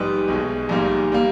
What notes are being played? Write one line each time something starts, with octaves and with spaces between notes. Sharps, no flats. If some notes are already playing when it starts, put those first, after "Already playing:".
Already playing: A#1 G#2 G3 B4 D#5
B1 B2 G#3
A#1 G#2 G3 A#3
G3 A#3